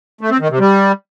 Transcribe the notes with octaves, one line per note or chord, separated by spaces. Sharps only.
A3
C4
D#3
C3
G3